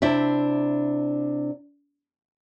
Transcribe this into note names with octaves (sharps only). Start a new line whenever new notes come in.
C3 D4 E4 E5